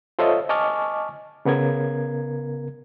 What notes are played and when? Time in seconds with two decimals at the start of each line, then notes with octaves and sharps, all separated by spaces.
0.19 F4 A4 C5 C#5 D#5 E5
0.49 D#5 G#5 A5 C#6 D6 F6
1.45 C#3 B3 A#4 G#6